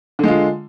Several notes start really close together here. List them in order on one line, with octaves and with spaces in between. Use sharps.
D3 G#3 F4